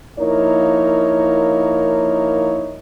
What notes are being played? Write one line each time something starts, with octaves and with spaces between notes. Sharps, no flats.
F3 A#3 D#4 E4 A#4 C#5